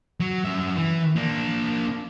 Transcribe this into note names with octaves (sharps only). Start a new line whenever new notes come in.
F#3
F#2 E5
E3
A#3 D4